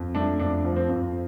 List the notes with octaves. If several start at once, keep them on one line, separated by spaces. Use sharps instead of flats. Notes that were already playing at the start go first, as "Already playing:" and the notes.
Already playing: F2
A3 D4
F2 D4
F3
C4
F2